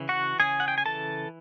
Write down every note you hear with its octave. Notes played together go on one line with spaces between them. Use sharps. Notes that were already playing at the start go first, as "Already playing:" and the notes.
Already playing: C#3 E3
F#4 F#5
C#3 G#4 G#5
F#5
G5
G#5
E3 A4 A5